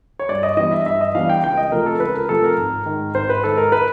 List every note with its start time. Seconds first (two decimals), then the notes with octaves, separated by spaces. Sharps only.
0.19 C#5
0.29 G2 D5
0.43 D#5
0.57 E3 G3 B3 D4 D#5
0.72 E5
0.86 G2 E5
1.01 D#5
1.15 E3 G3 B3 D4 F5
1.30 G5
1.43 C#2 G5
1.57 D#5
1.71 C3 F3 A3 A#4
1.86 A4
2.00 C#2 B4
2.14 A#4
2.29 C3 F3 A3 A4
2.44 A#4
2.57 G#1
2.86 G#2 D#3
3.15 G#1 C5
3.30 B4
3.44 G#2 D#3 A4
3.57 A#4
3.72 B4